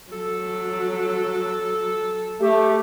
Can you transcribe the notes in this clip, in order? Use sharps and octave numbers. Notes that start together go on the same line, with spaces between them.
F#3 A4
A3 G4